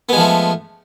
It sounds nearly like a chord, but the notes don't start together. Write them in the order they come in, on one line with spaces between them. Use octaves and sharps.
B3 G#3 F3 A3